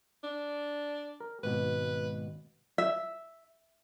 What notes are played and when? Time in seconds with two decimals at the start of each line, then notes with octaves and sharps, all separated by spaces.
0.24 D4
1.20 A#4
1.43 G#1 B2 B4
2.78 E5